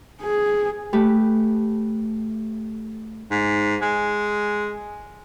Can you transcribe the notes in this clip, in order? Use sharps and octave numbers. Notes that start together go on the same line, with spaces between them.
G#4
A3 G4 B4
G#2
G#3